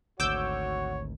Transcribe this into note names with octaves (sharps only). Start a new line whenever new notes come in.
G#1 D2 F#4 C#5 D6 E6 G6